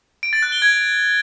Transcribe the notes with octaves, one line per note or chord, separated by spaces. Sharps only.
D7
A6
F#6
G7
G#6